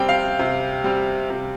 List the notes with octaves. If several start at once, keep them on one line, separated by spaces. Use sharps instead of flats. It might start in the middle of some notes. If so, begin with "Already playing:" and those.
Already playing: C3 G3 C4 G5
F5
C3
G3 C4
C3